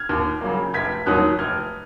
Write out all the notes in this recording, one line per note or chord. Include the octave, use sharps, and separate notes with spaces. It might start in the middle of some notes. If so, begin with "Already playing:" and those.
Already playing: F6 G#6
D#2
C#3 F#3 A#3
F1 G#6 B6
D#2 D#3 F#3 D#6 F#6
F1 F6 G#6